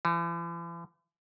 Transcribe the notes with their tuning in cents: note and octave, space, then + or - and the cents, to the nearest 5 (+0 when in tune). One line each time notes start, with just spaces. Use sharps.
E3 +45